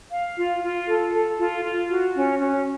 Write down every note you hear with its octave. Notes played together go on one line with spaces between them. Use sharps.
F5
F4
F4
A4
A4
F4
F4
F#4
C#4
C#4